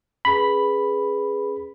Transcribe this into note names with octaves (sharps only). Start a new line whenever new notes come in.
C#4 G#4 B4 B5